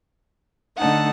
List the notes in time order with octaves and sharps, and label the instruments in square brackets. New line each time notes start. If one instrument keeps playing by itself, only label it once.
[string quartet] D3 A3 D#4 F#5 A5